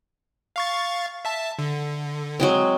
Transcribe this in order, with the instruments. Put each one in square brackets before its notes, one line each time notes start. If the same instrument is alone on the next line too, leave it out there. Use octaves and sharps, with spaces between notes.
[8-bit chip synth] F5 C#6 A6
E5 A5
D3
[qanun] F#3 G#3 C4